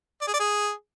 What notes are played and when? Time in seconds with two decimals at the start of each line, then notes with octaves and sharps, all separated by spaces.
0.21 D5
0.28 G#4
0.34 D5
0.40 G#4